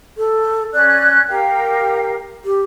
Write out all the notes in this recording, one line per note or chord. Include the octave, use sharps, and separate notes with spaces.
A4
C#4 D5 F#6
G4 A#4 F5 G5
G4